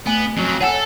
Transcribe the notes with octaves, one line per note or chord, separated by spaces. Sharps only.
A3 B3 G#5
F2 F#3
G#4 A4 C#5 F#5 G#5